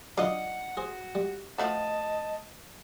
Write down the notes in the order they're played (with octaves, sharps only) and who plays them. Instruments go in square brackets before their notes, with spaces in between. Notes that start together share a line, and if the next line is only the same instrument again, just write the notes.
[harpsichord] D3 F#3 [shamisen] D4 F4 D#5 [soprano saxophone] F#5
[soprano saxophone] F#4 [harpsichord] G#4 C5
[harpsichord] G3
[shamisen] F3 A3 F#4 [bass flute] D#5 [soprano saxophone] A5